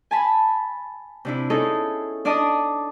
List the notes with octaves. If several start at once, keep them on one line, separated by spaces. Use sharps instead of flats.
G#5 A5 B5
C3 D4 E4
C#4 D#4 E4 G#4 A4
D4 D5 D#5 A5 D#6